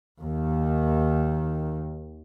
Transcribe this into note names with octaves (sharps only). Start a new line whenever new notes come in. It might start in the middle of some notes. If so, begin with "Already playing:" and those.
D#2 D#3